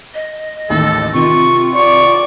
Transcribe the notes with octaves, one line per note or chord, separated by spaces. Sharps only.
D#5
A1 D#2 A4
C3 D#3 F4 C#6
D5 C#6